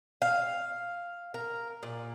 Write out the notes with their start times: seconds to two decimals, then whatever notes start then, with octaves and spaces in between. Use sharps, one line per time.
0.22 F5
1.34 A#4
1.83 A#2